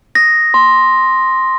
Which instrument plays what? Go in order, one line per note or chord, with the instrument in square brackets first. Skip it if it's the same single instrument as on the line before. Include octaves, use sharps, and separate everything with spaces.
[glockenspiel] D#6 A#6
C6